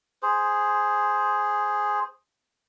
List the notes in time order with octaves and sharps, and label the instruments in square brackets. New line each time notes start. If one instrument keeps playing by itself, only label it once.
[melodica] G#4 C5